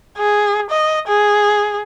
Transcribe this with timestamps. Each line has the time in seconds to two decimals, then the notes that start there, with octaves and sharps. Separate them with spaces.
0.18 G#4
0.70 D#5
1.08 G#4